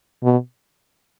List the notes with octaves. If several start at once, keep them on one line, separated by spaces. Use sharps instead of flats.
B2